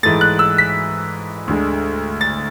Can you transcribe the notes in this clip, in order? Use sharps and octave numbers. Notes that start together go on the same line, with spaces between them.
G#2 E3 A3 A6
F#6
E6
B6
D2 D3 G#3
A6